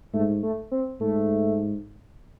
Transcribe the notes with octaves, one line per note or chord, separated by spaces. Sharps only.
G#2 A3
A3
C4
G#2 A3